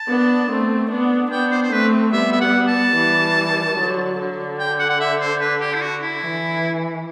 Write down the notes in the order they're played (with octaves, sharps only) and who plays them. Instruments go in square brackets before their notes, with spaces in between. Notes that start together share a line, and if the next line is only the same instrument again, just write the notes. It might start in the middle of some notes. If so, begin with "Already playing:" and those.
Already playing: [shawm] A5
[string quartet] B3 D4
A3 C4
B3 D4
[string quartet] B3 D4 [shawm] G5
[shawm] C5
C5
[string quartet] A3 C4 [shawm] B4
[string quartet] G3 B3 [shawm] E5
[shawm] E5
F#5
A5
[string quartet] E3 G3
D3 F#3
D3
[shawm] G5
F#5
F#5
E5
C5
B4
G4
E4
F#4
E4
[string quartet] E3